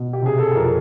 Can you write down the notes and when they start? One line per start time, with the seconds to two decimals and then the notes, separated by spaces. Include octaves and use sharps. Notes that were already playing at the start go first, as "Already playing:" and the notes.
Already playing: B2
0.13 G4
0.22 C3 G#4
0.39 A4
0.55 F2 A#4